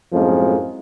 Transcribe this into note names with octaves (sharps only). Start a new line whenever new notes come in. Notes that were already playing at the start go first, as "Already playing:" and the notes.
F#2 A2 F3 G#3 A#3 C4